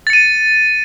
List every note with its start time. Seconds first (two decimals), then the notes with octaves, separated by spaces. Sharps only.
0.07 A6
0.10 C#7
0.13 D#7